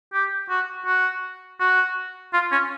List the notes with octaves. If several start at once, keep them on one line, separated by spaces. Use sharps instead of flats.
G4
F#4
F#4
F#4
F4
C#4